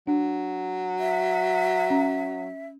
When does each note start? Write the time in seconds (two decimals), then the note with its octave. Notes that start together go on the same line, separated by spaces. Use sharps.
0.07 F#3 D4
1.00 E5
1.90 C#4 A#5